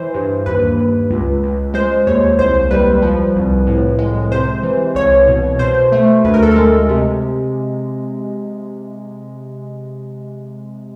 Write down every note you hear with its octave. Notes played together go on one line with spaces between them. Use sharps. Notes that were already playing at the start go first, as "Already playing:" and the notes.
Already playing: E3 C5
G2
D#2 B4
D#2
C#2
C#2
G#3 C5
D#2 C#5
C2 C5
G3 B4
F3
C2
A2
G#3
C3 C5
E3
C2 C#5
B2
B2 C5
A3
D2 B4
A#4
A4
G#3 A#4
C3